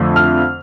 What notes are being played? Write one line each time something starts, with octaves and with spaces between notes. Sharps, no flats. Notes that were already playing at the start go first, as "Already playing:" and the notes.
Already playing: F2 D3 F3 A3
F6